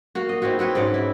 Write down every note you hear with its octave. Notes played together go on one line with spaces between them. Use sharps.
A#3 F#4
D#5
C4 D#4 E4 F#4
C4 F#4 B4 C#5
G#2 C#4 D5 F#5
E4